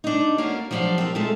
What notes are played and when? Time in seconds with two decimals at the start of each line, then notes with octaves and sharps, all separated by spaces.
0.04 D4 D#4
0.38 A#3 C#4 D4 F#4 A#4
0.71 F3 F#3 D4 G4 D5 F5
0.98 C4 A#4
1.15 A#2 G#3 A3 F4 A4 E5